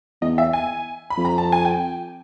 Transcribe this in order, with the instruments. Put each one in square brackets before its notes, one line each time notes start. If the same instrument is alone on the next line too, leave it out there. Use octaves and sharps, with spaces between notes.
[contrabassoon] E2 [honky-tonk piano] D#5
[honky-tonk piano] E5
G#5
B5
[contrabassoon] F2
[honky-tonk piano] A#5
A5
G#5
G5